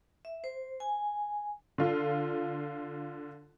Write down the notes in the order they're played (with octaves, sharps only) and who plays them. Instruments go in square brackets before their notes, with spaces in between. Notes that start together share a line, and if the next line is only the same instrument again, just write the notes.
[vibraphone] E5
C5
G#5
[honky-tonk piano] D3 F4